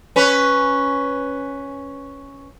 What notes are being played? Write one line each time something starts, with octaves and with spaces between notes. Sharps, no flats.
C#4 B4